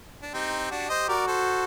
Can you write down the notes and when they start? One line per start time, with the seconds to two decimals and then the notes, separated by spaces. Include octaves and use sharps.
0.22 D4
0.33 C4 D#4 G4
0.71 D4 F#4
0.89 C5 D#5
1.08 F#4 A#4 D5
1.27 A4 C5